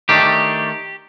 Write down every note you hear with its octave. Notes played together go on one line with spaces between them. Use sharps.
D#3 A3 D4 G4